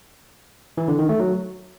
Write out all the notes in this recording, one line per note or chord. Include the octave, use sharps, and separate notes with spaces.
E3
D3
D#3
A3
F#3